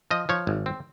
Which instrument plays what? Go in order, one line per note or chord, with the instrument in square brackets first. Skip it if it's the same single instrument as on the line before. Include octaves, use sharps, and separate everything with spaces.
[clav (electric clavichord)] F3 D#5
F3 C#5
G#1
C4